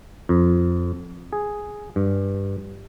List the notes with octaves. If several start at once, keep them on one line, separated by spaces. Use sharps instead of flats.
F2
G#4
G2